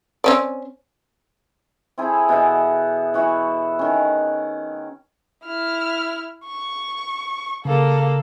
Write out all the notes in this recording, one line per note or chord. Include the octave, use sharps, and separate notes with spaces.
C4 C#4 D5
C4 E4 G#4 A4
B2 E3 E5 F#5
E3 F#4 E5 C#6
D#3 C#4
E4 F6
C#6
C#3 A#3 A4